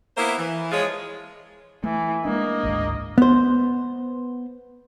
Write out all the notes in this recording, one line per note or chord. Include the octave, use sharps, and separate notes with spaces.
A#3 B3 E4 C5 E5
E3
F3 G#3 F4 G#4 C#5
E3 A3
G#3 A#3 D4 D#5
G#1 D2 G#2
B3 C5